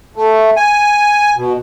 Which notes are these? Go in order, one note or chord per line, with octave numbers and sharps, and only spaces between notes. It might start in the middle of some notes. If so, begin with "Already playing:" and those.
A3
G#5
B2